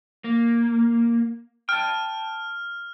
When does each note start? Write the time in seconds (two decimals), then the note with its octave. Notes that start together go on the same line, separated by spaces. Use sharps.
0.24 A#3
1.69 G5 A5 F6